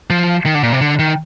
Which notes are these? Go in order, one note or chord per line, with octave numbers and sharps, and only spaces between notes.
F3
D#3
D3
A#2
C3
D3
D#3